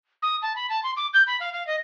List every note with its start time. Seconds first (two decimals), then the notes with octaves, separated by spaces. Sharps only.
0.22 D#6
0.42 A5
0.56 B5
0.70 A5
0.83 C6
0.97 D6
1.14 G6
1.27 B5
1.40 F5
1.53 F5
1.67 D#5